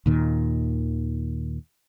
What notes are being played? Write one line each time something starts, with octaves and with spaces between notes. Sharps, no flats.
D#2 A#2 D#3